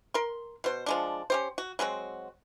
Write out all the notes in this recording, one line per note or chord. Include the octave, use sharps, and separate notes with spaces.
A#4 C6
B2 C5
F3 G#3 D4
C#4 G4 C5
F#4
F#3 G#3 C4 F#4